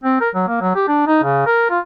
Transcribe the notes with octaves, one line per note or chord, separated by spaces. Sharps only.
C4
A#4
F#3
A#3
F#3
G4
D4
D#4
C#3
A#4
F4